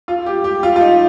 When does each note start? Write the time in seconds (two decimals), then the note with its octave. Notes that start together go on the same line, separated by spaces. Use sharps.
0.08 F4
0.26 G4
0.44 G4
0.63 F4
0.76 F4
0.81 D#4